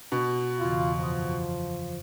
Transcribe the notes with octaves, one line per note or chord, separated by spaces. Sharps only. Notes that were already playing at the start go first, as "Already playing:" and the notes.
B2
E2 C#3 E3 F4
F#2 F3 C6 D#6